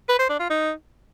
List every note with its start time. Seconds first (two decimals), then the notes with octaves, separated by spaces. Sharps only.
0.09 B4
0.19 C5
0.29 D4
0.39 F4
0.50 D#4